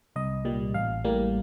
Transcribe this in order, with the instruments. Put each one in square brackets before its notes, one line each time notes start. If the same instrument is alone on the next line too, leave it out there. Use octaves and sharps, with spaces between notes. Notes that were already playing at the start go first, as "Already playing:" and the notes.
[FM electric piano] C2 D#5
A#2 G3
A1 F5
A2 G3 A#3